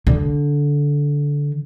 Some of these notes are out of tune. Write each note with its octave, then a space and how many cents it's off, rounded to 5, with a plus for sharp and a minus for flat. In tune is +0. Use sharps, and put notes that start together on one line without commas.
D3 -15